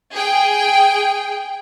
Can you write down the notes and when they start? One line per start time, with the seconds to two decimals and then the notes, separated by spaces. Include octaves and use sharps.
0.13 G#4 G5